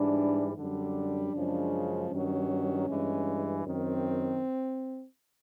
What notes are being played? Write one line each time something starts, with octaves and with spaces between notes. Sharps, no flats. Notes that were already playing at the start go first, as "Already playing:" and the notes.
Already playing: G#2 E3 G3 D4
F#2 D3 G3 D4
F#2 C#3 F3 G#3
G2 D#3 F#3 C#4
G2 E3 G#3
F#2 D#3 C4